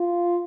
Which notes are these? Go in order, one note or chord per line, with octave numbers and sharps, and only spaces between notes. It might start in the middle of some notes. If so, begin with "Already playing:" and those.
Already playing: F4